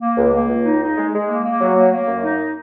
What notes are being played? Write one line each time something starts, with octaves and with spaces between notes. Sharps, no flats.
A#3
C#2
A#3
C#2
D#4
D#4
G#3
G#3
A#3
A#3
F#3
A#3
A#3
F#2
D#4